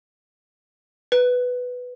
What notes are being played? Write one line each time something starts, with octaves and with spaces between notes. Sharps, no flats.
B4